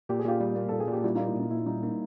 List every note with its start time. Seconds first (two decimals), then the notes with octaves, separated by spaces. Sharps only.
0.09 A#2 G4
0.19 G#4
0.25 A#2 F4 G4
0.40 G3
0.56 A#3
0.69 A#2 A4
0.80 G#4
0.88 A#2 G4
1.04 G3 E4 F#4
1.15 D#4 F4
1.19 A#3
1.27 E4
1.35 A#2 D#4
1.51 A#2 E4
1.66 G3 D#4
1.83 A#3 D#4